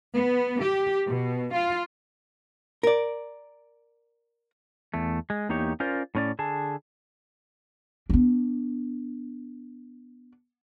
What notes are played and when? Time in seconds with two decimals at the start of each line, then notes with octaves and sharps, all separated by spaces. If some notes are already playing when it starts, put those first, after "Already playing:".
0.16 B3
0.62 G4
1.08 B2
1.53 F4
2.83 A#4 D5
4.94 E2 A3
5.30 G#3
5.49 E2 A#3 D#4 G4 C#5
5.80 C#4 F4 A#4 C5 D5
6.15 A2 C#4 D5
6.39 D3 G#4 A5
8.10 B3 D4